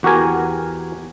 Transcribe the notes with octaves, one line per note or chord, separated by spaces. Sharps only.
E2 F#4 G4 A#4 G#5